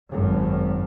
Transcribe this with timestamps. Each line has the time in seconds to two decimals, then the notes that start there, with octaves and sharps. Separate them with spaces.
0.11 G#1 F#2